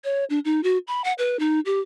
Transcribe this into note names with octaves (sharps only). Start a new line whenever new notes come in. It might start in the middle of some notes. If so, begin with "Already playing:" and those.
C#5
D4
D#4
F#4
B5
F#5
B4
D#4
G4